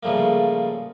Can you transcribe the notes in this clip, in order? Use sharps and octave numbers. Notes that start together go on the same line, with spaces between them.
C#3 F3 G3 A3 A#3